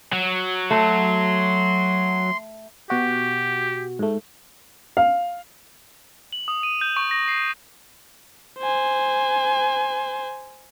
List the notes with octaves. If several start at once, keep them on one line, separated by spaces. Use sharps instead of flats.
F#3
A3 C6
B2 F#4 G4
G#2 A3
F5
F#7
D#6
D#7
G6
C#6
A#6
C7
C5 G#5